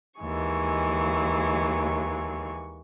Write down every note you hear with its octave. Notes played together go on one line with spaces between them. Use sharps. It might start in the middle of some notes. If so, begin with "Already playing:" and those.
D#2 E3 G#3 C#6